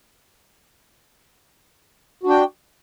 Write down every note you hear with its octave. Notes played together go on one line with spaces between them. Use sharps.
D4 F#4 G5